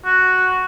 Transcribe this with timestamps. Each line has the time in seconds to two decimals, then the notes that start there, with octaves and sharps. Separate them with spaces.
0.06 F#4